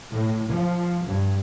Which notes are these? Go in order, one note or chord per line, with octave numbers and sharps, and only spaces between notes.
A2
F3
G2